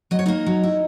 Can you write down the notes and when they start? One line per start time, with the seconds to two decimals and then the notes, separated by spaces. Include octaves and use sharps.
0.11 F#3 D#5
0.19 C#5
0.26 A#3 D#4 D#5
0.46 F#3
0.64 E4